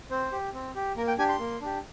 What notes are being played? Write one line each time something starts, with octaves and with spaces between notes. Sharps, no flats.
C4 C5
G4
C4
G4
A#3 A#4
G5
D4 G4 G#5
C6
A#3
D4 G4